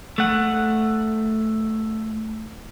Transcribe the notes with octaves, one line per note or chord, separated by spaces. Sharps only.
A3 F#5